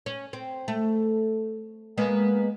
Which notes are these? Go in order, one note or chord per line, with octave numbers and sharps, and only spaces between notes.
C#4
C4
A3
G#3 A#3 B3